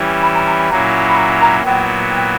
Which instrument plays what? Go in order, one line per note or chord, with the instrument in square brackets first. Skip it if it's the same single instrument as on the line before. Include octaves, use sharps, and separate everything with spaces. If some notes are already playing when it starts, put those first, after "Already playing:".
Already playing: [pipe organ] E3 G3 C#4 E4
[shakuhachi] B5
A#5
A#5
B5
[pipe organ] A#2 F#3 A#3 C#4 E4 [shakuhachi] A#5
[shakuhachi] B5
A#5
A#5
[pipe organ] A#2 F#3 B3 E4 [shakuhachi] G5
[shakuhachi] G5